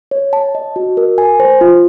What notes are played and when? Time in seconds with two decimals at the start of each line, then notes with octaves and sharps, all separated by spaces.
0.11 C#5
0.33 A5
0.55 D#5
0.76 F#4
0.97 A#4
1.18 G#5
1.40 C5
1.61 F4